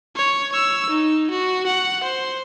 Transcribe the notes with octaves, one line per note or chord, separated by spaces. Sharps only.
C#5
C#5 E6
D#4
F#4
F#5
C5